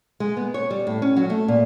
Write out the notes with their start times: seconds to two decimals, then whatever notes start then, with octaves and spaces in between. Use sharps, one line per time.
0.20 G#3
0.37 B3
0.54 C#5
0.71 G3
0.87 A2
1.02 C#4
1.17 F#3
1.30 A3
1.48 A#2